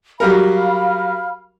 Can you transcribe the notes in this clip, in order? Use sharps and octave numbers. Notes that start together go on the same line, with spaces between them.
F#3 G3 A#4 F5 B5 F6